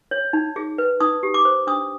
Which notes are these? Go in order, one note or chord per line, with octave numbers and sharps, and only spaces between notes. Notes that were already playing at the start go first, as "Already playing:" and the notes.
C#5
D#4
G#4
B4
D#4 D#6
G4
D6
C5
D4 D#6